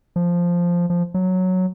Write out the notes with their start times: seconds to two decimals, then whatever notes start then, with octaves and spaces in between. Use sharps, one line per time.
0.16 F3
0.90 F3
1.14 F#3